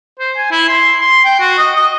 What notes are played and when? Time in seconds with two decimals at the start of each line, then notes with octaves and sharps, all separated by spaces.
0.19 C5
0.37 G#5
0.51 E4
0.68 C6
1.01 C6
1.25 G5
1.40 F#4
1.58 D#5
1.76 D#5